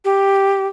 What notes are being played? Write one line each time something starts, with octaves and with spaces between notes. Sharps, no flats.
G4